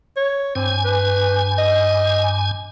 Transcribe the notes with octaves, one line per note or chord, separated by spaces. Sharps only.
C#5
G2 C4 G#5
B4
D#5